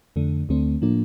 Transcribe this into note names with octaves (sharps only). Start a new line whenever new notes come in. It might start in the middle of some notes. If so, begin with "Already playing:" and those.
F2 D3 A3
D2 D3 A3 C4
A2 F3 A#3 D4